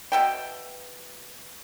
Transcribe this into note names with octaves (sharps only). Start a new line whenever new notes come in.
B2 E5 G5